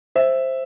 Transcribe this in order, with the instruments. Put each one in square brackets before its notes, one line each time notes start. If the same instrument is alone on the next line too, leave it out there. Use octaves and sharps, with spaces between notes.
[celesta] C5 [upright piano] E5